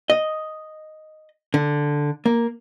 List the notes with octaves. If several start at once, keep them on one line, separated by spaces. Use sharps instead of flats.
D#5
D3
A#3